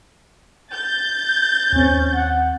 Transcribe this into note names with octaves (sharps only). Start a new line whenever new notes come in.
G6 A6
D#2 C4 C#4
F#5